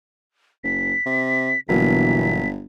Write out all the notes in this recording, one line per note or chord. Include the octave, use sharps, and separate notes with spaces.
F#1 B6
C3
G1 B2 D3 E3 F#3 A#3 B6